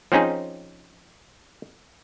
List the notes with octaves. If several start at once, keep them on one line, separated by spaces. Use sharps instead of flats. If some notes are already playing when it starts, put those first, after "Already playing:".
F3 C4 C#4 D#4 G#4